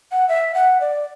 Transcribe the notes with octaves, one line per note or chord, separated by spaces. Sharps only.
F#5
E5
F#5
D5